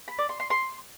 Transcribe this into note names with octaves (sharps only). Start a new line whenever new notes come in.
B5
D5
C6
C6
C6